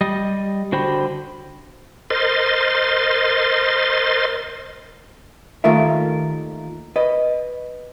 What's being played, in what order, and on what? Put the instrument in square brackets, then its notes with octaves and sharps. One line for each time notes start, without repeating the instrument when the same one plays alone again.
[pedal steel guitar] G3 D#5
D3 F#4 C5 G5 B5
[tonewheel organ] A#4 C5 D#5 C6 A6
[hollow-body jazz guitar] D#2 D#3 A3 F4 A#4 E5
B4 D#5